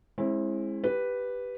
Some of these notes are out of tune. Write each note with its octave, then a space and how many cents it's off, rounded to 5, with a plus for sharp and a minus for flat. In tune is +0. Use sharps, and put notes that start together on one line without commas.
G#3 +0 C4 +40 E4 +0
G4 -5 B4 +0